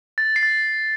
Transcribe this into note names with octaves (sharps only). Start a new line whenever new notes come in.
A6
C7
A6